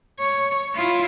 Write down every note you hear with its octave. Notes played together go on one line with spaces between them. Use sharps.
C#5
E4 F4